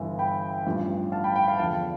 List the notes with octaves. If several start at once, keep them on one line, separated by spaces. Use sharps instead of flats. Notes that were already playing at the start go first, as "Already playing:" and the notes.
Already playing: G1 G2 E3
G5 B5
A1 G2 F3
F5 A5
G5 B5
G5 B5
F5 A5
E2 D3 F3 F5 A5